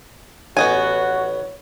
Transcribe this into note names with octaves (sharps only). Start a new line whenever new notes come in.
A1 B3 F#4 C#5 D#5 G#5